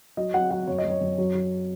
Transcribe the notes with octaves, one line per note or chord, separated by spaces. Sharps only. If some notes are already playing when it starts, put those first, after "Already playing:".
F#3 D#5
F#3 F#5
F#3 F#5
F#2 C#5
D#5
F#2
C#5
F#2
F#3
F#3